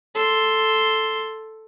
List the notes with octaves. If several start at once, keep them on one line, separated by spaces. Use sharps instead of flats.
A4 C6